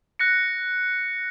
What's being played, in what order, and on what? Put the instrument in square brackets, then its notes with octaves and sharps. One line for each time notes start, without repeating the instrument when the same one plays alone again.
[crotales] F#6 A#6 C#7